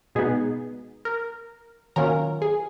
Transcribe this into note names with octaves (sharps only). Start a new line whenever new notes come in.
B2 G#3 B3 D#4 G#4
A#4
D#3 F#3 A#3 C#4 F4 A#4
G#4